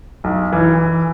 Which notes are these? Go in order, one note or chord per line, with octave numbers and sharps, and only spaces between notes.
B1
E3